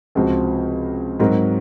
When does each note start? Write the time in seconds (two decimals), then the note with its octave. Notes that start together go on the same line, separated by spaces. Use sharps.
0.15 C#2 C3 F3 C4 F#4
1.20 G#2 F#3 C4 F#4 A#4